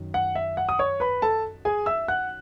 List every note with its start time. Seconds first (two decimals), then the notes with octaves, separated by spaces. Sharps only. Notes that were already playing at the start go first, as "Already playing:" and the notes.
Already playing: F#2 D#3
0.14 F#5
0.35 E5
0.57 F#5
0.69 D#6
0.79 C#5 C#6
1.00 B4 B5
1.22 A4 A5
1.65 G#4 G#5
1.86 E5 E6
2.08 F#5 F#6